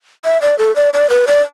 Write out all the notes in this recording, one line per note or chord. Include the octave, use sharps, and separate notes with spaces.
E5
D5
A4
D5
D5
B4
D5